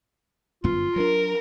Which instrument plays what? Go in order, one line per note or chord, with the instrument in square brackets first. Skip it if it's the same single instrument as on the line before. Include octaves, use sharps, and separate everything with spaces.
[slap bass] G1 F#2 B3 [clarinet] F4
[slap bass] F#3 D4 [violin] A#4